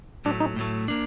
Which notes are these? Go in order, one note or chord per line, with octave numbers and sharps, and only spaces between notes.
A2 F#3 A3 D4
D#4
A2 F#3 A3
A#3 D4